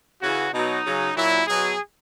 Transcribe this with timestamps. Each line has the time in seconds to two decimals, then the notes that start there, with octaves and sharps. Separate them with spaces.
0.21 C#3 E3 F#4
0.52 B2 F#3 D#4
0.84 C#3 F#3
1.15 A#2 F#3 E4
1.47 B2 F#3 G#4